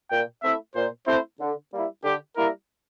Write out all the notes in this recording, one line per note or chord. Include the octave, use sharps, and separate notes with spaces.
A#2 G5
A3 C4 E4 E5
A#2 C5
A3 C4 E4 C5
D3
G3 A#3 E4
D3 G4
G3 A#3 E4 A#4